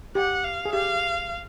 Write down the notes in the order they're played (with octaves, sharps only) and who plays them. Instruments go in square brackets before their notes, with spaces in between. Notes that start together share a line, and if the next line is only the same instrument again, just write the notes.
[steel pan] G4 [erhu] F#5
[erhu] F5
[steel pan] G#4
[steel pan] G4 [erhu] F5